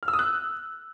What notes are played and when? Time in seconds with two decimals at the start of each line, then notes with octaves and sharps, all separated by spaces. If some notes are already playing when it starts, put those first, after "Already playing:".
0.03 F6
0.08 E6
0.13 D#6
0.19 F#6